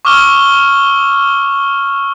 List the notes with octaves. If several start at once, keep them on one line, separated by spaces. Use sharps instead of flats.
C#6 D6 E6 F6 G7